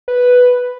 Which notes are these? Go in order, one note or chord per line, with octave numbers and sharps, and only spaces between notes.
B4